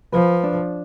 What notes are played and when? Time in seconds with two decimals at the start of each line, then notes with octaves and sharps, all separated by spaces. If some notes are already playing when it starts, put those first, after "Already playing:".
0.12 F3 B4
0.43 D4